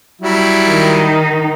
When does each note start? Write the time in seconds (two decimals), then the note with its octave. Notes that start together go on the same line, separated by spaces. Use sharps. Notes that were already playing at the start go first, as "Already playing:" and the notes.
0.21 F#3 G3 E4
0.68 D#3 D#4